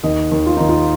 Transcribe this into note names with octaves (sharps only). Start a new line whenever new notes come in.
D#2 D#5
D#2
F4
D#2 D#4
F4